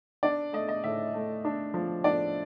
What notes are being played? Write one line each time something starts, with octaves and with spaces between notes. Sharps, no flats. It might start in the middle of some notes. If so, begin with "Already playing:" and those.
D4 D5
A3 D#5
D#5
A2 E5
A3
D4
F3
D4 D5